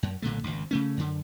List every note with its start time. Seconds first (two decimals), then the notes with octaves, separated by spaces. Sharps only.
0.03 F#2
0.22 B1 A#2 D3 A3
0.44 G#1 C#2
0.71 C#3 A3 C#4
0.97 F#2 D3